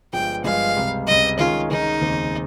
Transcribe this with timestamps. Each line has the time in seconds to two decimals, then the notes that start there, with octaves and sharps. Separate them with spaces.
0.13 G1 G2 F3 G#3 G5
0.44 G1 G2 F3 G#3 F5
0.76 C#2 C3 G3
1.07 C#2 C3 G3 D#5
1.39 D#3 G#3 C#4 F4 G#4
1.70 D#3 G#3 C#4 D#4 G#4
2.01 F1 D#2 C#3 G#3 C4